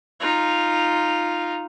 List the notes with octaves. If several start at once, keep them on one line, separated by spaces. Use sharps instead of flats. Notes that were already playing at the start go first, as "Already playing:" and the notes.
D#4 F4